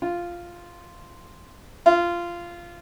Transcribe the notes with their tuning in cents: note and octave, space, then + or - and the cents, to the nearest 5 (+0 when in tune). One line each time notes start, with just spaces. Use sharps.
F4 -5
F4 -15